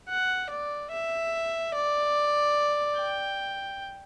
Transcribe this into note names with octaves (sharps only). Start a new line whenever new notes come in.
F#5
D5
E5
D5
G5